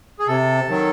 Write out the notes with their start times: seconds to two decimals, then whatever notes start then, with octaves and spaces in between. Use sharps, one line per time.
0.19 G#4
0.27 C3 A4
0.68 D#3 F#3